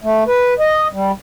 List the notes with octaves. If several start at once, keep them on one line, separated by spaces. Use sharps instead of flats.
A3
B4
D#5
G3